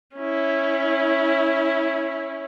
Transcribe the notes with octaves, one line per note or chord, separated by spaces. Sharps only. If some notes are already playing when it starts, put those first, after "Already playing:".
C#4 E4